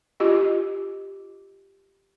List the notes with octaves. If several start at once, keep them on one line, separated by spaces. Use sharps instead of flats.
F4 G4 D#5